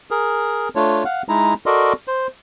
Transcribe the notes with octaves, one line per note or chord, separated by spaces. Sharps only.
G#4 A#4
A3 D4 F4 C#5
F5 F#5
G#3 D#4 E4 A#5
F#4 A4 A#4 D5 D#5 C6
C5